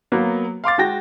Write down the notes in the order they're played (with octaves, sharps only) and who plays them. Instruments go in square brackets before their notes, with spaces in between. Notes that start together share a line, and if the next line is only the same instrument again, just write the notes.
[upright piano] F#3 A#3 B3
F5 C6 D6 A6
G#3 F#4 G5 A#6